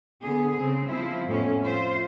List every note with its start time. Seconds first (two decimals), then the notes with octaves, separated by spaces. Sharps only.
0.23 D3 B3 G#4
0.59 C#3 C4
0.89 F3 C4 E4
1.25 F2 A2 A3 B3 C#4
1.62 F4 C5 E5